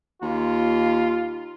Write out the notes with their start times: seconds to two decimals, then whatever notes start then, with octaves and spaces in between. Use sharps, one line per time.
0.22 D#2 F4